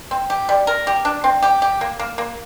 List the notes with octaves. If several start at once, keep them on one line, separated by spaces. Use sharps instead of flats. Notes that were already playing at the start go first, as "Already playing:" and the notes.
C4
G4
G3
A#4
G4
D4
C4
G4
G4
A#3
A#3
A#3